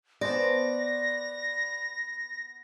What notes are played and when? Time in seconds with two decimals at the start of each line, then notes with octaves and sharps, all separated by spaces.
0.21 B3 C5 D5 A5 A#6